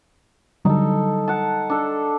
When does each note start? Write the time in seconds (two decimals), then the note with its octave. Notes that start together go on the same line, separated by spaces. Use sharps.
0.65 D3 F#3 G3 D#4 A4
1.28 F#5 A5
1.70 D4 A4